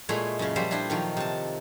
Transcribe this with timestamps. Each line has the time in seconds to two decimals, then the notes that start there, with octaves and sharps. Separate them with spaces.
0.09 A#2 G#3 A3 E4 C#5 D#5
0.39 F#2 C#3
0.56 F3 G3 C5 E5
0.71 D4 E4 C5 D#5
0.90 D#3 F3 F#3
1.17 C3 A5